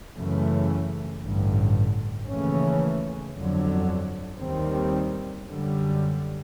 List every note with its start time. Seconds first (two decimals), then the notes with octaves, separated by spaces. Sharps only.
0.16 F#2 C#3 E3 A3
1.22 A1 G2 D3
2.28 D#2 C#3 E3 A3 C#4
3.34 G1 F2 D3 F#3
4.40 D#2 D#3 G3 C4
5.46 F#2 D3 G3